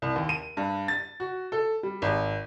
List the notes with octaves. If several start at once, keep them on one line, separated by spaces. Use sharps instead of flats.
C2
D#2
D#7
G2
A6
F#4
A4
G3
G#1